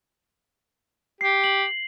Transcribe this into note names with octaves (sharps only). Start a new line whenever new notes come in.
G4 C7
F#7